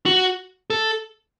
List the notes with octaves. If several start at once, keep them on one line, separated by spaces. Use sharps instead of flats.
F#4
A4